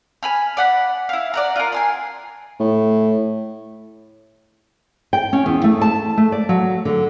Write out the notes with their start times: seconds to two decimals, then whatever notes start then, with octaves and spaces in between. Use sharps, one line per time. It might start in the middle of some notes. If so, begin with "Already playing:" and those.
0.23 G#5 B5 F6
0.57 D5 F#5 B5
1.09 E4 F5
1.34 D5 F#5 A#5
1.56 F4 A#4
1.72 G#5 A5 C6
2.60 A2
5.13 G5
5.33 C#4
5.46 E2
5.64 A3
5.81 A5
6.17 A3
6.32 D5
6.49 F#3
6.85 D3